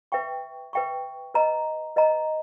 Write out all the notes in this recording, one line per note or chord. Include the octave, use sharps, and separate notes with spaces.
B4 E5 G5 C#6
B4 E5 G5 C#6
B4 D#5 A#5
B4 D#5 A#5